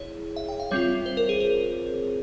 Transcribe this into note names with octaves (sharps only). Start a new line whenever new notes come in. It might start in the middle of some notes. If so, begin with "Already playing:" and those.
Already playing: E4 G#4 C#5
E5
G5
F5
G3 C4 F4 C#5
C5
A#4
G#4
A#4